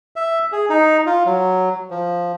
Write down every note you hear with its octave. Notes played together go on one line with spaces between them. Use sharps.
E5
G#4
D#4
F4
F#3
F3